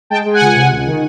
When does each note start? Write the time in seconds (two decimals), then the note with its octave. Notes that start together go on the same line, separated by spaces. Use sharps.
0.10 G#3 G5 A5
0.26 G#3
0.33 F#5 G#5
0.41 C#2
0.55 C3
0.72 C#2
0.87 D#3